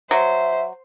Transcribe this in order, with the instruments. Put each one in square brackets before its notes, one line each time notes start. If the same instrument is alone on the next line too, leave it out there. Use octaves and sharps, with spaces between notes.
[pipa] F#3 [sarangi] C5 [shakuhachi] E5